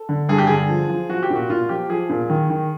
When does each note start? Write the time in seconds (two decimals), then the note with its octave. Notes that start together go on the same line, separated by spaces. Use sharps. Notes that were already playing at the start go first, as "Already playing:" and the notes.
Already playing: A4
0.09 D3
0.29 G2 G#4
0.38 G4
0.47 D3 G#4
0.69 F3
0.89 F3
1.09 F3 F#4
1.23 G4
1.30 A#2
1.36 F#4
1.49 A#2 F4
1.69 F3 G4
1.89 F3 G#4
2.09 A#2
2.30 D#3
2.50 D#3